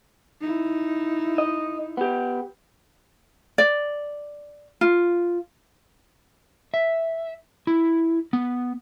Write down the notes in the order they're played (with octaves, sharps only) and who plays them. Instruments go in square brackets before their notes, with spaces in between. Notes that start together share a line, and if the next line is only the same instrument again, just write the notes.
[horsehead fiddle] D#4 E4
[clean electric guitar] D#5
B3 G4
[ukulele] D5
F4
[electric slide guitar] E5
E4
B3